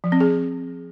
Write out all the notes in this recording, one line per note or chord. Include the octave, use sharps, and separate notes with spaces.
F3
C4
G#4